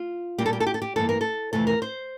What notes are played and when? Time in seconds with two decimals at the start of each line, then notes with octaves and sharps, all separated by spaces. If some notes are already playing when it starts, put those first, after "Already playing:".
Already playing: F4
0.38 A#2 G3 A#3 G4
0.46 A4
0.53 G4
0.60 A4
0.67 G4
0.74 A4
0.82 G4
0.96 G2 E3 A#3 A4
1.09 A#4
1.21 A4
1.53 F2 C3 E3 A3 A4
1.67 A#4
1.82 C5